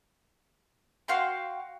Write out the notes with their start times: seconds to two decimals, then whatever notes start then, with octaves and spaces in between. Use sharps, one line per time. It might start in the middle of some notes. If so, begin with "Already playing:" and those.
1.08 F#4 F5 G5 C6